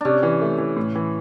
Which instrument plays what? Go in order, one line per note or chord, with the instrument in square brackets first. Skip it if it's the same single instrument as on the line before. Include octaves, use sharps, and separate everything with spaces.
[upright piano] C3 [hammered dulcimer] C#4 D4
[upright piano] E3
A3
E3
A2
E3